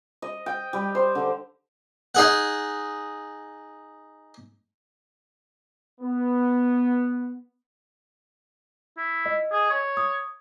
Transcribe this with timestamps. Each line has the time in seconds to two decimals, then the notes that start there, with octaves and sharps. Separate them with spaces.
0.22 D#5
0.46 G5
0.73 G3
0.95 C5
1.15 D3
2.15 D#4 G#4 F#5
6.01 B3
8.98 E4
9.26 D#5
9.52 G#4
9.71 C#5
9.97 D#6